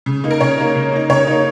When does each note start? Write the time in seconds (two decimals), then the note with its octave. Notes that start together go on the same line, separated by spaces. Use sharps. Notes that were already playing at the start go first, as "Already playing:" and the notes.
0.06 C#3
0.24 A#3 D#4
0.31 A#4
0.40 C#3 C#5
0.57 A#3 D#4
0.75 C#3
0.92 A#3 D#4
1.10 C#3 C#5
1.27 A#3 D#4